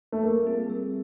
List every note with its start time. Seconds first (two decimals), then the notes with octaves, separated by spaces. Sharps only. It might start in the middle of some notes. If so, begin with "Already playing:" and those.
0.12 A3
0.23 G3 A#3
0.47 C4 F4 G#4
0.70 G3